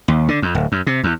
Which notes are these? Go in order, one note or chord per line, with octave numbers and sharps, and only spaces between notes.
D#2
D3
F2
D1
F#2
C3
E2